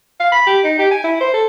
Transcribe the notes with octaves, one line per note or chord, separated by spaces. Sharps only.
F5
B5
G4
D#4
G4
G#5
E4
C5
A4